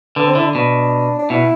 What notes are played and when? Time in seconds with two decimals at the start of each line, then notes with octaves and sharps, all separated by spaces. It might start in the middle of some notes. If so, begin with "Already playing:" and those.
0.16 D3 B3
0.26 C4
0.35 D3 E4
0.45 D4
0.55 B2
1.19 D4
1.30 B2 E4